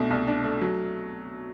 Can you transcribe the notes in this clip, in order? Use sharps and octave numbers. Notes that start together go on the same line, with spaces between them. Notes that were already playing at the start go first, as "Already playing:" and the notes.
Already playing: C2 B2 A3 D4
C2
D4
A3
F#3